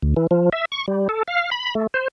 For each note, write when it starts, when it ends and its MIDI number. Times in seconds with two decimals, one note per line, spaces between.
0.02 0.14 38
0.16 0.27 52
0.31 0.50 53
0.53 0.65 76
0.72 0.86 85
0.88 1.08 55
1.09 1.23 69
1.28 1.50 77
1.51 1.74 83
1.75 1.87 57
1.94 2.08 72